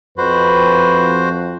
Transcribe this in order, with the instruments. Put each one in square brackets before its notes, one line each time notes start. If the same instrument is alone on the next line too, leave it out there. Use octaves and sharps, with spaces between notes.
[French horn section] F2 [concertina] F#4 C5 [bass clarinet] B4